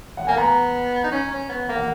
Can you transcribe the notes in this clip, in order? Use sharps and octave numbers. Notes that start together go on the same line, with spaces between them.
F#5
A#3 G#5
B3 A#5
D#4
C#4
C#4
B3
A#3
F#5